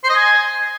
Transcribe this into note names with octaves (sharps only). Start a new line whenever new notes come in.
C5
D#5
G#5